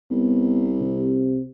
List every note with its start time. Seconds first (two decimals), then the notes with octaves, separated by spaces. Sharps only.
0.11 C2 B3
0.80 C3